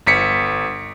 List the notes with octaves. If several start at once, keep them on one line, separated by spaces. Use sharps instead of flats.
G1 B6 C#7